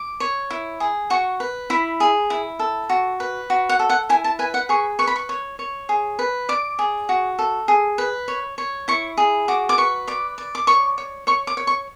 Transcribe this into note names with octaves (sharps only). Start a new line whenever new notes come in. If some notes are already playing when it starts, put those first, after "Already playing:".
Already playing: D6
C#5
E4
G#4
F#4 C#6
B4
E4 B5
G#4
E4
A4
F#4
B4
F#4
F#5
A4
F#5
E4 G#5
A5
B4 G#5
F#5
G#4 C#6
B4 C#6
B5
C#6
C#5
C#5
G#4
B4
D5 D6
G#4
F#4
A4
G#4
B4
C#5
C#5
E4 C#6
G#4
F#4 D6
D6
B4 C#6
D5 D6
D5
D6
C#5 C#6
C#5
C#5 C#6
D6
C#5
C#6